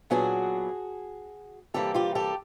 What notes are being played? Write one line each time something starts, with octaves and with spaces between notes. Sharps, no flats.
A#2 F#3 B3 D4 F#4 G#4
C3 E3 G3 A#3 G4 A4
F4 G4
G4 A4